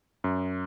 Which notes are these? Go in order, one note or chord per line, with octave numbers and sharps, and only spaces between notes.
F#2